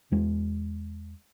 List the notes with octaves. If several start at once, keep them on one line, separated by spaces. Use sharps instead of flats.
E2 G#3